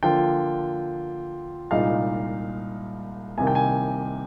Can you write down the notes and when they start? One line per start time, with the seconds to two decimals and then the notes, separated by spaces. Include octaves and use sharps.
0.03 D3 F3 A#3 F4 G5
1.71 C2 A#2 G#3 D#4 F5
3.38 C2 C3 D#3 A#3 G#5
3.47 G5
3.55 G#5